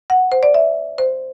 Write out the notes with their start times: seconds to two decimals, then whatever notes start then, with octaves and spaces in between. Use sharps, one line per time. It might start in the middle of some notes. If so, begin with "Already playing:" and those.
0.10 F#5
0.32 C5
0.43 D5
0.54 E5
0.98 C5